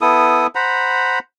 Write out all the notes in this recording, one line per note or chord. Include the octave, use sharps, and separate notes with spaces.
B3 E4 A4 D#6
C5 F#5 A#5 B5